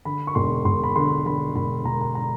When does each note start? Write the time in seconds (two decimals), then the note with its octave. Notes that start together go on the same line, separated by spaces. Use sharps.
0.05 D3 B5
0.27 C#6
0.35 E1 C6
0.65 E1 C6
0.84 B5
0.96 D3 C6
1.26 D3 B5
1.56 E1 B5
1.85 E1 A#5
2.01 A#5
2.15 A#5